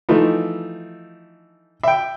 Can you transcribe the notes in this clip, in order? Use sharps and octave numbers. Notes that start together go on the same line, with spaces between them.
E3 F3 A3 D#4
E5 G5